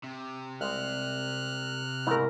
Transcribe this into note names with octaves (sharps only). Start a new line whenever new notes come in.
C3
C2 G#3 F6 F#6
G#2 C#3 A3 E4 A#4